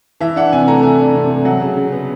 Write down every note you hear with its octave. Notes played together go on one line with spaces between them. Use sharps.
E3 E5
D4 F#5
C3 G#5
A3 A#5
E3 G#5
D4
C3
A3
F#3 F#5
C#3
C#3
B3